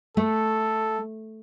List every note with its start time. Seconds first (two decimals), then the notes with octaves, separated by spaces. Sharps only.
0.17 A3 A4